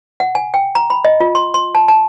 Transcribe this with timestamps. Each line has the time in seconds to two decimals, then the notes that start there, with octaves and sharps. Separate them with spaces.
0.20 F#5
0.35 G#5
0.54 G5
0.75 A#5
0.90 B5
1.05 D#5
1.21 F4
1.35 C6
1.54 C6
1.75 A5
1.88 A5